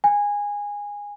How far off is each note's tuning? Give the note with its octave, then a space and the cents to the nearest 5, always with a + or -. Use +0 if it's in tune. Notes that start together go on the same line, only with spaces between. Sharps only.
G#5 -20